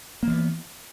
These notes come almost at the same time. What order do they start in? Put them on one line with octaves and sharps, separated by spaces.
A#3 E3 B3